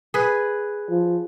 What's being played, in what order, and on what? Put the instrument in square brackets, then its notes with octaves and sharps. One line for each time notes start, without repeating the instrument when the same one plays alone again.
[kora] G#4 B4
[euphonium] F3